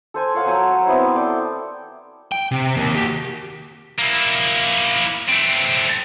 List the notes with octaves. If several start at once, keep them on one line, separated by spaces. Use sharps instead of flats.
A4 C5 G#5
C5 C#5 F5 F#5
F#3 G#5 A#5 E6
B3 C4 E4 C6
A4 D5 G5
G5
C3
D#2
F#4 G4
A#3 E4
A3 C4